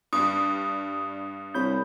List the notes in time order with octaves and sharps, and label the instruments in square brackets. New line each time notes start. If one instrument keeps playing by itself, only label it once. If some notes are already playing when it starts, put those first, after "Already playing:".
[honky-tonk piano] G2 G3 [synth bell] D#6
[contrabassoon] C2 [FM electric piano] C#5 B5 G6